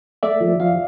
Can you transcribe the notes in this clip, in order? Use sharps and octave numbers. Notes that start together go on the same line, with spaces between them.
A3 D5 E5
F3
F3 F5